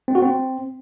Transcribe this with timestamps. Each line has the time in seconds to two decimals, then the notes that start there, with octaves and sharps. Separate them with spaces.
0.08 C4
0.15 F#4
0.22 C4